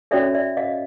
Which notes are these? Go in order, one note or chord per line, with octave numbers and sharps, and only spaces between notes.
C#4 F#4 A4 C#5 D5 E5
D5 E5
D#5 F5